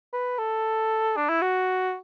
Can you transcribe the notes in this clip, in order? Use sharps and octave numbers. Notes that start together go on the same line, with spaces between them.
B4
A4
D4
E4
F#4